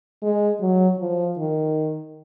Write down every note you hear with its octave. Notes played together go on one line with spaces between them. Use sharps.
G#3
F#3
F3
D#3